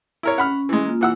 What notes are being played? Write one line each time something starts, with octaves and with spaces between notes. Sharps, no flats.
E4 A#4 C#5
C#4 F#5 B5 F6
E3 G#3
A#3 F4
E3 F#5 E6